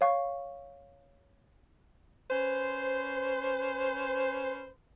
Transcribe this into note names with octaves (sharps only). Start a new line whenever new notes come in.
C#5 F5 C#6
C#4 B4 C5